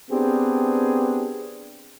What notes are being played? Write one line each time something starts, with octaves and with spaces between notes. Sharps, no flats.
B3 C4 D4 G4 G#4